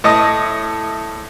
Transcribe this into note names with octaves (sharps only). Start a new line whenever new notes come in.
A2 D#5 A5 D#6